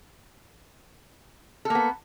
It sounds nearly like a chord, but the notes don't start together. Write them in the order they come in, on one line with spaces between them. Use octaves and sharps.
A4 A#3 B3